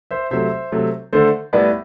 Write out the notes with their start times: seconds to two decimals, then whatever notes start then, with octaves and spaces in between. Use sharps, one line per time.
0.11 C5 E5
0.31 C3 F#3 A3 C5 E5
0.72 C3 F#3 A3
1.13 D3 A3 A4 C5
1.53 A2 G3 B3 B4 D5